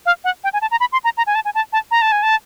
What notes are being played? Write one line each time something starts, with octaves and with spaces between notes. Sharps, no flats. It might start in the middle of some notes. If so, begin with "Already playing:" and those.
F5
F#5
G5
G#5
A5
A#5
B5
C6
A#5
A#5
G#5
A5
G#5
A5
A5
A#5
A5
G#5
A5